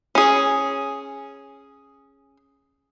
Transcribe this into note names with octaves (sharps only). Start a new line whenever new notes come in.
C#4 G#4